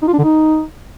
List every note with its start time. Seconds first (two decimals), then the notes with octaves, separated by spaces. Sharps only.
0.03 D#4
0.08 F4
0.13 D4
0.19 D3
0.24 D#4